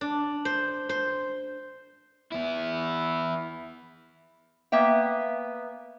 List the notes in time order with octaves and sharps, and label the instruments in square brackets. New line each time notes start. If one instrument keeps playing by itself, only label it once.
[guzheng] D4
C5
C5
[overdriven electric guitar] B3 E4
[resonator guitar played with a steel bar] A#3 B3 E5 G5